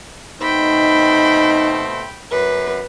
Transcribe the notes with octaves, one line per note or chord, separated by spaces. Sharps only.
B2 A3 C4 D#4 G5 B5
F#2 B4